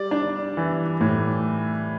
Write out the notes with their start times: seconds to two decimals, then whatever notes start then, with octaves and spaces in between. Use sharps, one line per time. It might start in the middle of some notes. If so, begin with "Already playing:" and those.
Already playing: G3 D5
0.11 D4
0.57 E3
1.01 A2